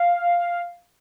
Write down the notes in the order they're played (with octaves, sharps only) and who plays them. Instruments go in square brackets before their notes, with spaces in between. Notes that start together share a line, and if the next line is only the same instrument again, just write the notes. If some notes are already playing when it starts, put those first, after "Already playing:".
Already playing: [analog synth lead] F5